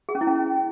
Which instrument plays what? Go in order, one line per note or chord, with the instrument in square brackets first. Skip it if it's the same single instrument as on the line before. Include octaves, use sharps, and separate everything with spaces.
[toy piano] G#4
C#4
E4
C#4